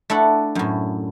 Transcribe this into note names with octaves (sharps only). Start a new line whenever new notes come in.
A3 D4 E4 A4 F#5
F#2 A2